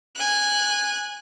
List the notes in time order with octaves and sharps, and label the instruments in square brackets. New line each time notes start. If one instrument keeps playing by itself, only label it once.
[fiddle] G#5 F#6